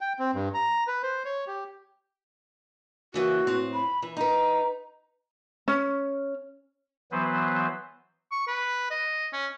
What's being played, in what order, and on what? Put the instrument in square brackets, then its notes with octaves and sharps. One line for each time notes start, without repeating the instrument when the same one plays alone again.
[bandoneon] G5
C4
G2
A#5
B4
C5
C#5
G4
[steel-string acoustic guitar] C#3 E3 A#3 [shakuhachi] F#4
[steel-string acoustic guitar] A2 C4
[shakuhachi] B5
[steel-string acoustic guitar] E3
[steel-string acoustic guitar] D#4 B4 [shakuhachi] A#5
[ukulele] C#4
[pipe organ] E3 F#3 B3 B4 C5
[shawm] C#6
B4
D#5
C#4